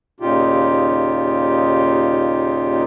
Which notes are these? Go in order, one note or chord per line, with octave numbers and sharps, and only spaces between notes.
D#2 A#2 C#3 D#4 F4 G4